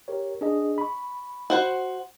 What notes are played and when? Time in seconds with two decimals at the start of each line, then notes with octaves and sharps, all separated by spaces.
0.08 G4 A#4 C#5
0.41 D4 G#4 D#5
0.78 B5 C#6
1.50 F#4 C5 F#5